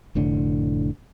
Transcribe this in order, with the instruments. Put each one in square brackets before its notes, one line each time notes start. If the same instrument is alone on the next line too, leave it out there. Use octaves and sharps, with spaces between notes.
[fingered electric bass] F1 A2 D3